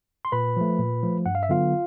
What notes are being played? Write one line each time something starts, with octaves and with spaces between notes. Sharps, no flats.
C6
A#2 B4 B5
F3 A3
A#2
F3 A3
G2 F#5
F5
E5
D3 F#3 B3 F4 F5